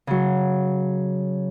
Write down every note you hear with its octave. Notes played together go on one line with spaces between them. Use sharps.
C#3 F#3